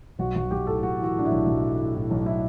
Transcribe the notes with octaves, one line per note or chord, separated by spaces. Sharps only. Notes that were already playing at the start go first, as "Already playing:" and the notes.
B1 F#4
B1 F#4
B1 G4
A2 A4
B1 F#4
E3 F#4
A2 D4
E4
B1
B1
A2
A2
A2
B1
E4